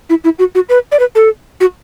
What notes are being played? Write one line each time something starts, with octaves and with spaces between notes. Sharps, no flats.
E4
E4
F#4
F#4
B4
D5
B4
A4
F#4